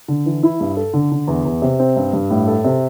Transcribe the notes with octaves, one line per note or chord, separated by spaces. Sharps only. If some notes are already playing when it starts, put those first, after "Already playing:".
D3
E3
E4
G2
A4
D3
D3
E2
E2
C3
C4
G2
G2
A2
A4
C3